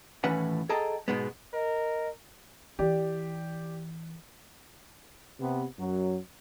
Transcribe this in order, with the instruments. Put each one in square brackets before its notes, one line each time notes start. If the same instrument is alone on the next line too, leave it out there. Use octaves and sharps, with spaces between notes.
[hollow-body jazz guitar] D#2 A2 E3 C#4 B4 F#5
G#4 A4 D#5 G5 A5 A#5
G#2 B2 G#3 B3
[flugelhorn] A#4 [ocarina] D#5
[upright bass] E3 [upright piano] G4 D5
[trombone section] C3 B3
F#2 F#3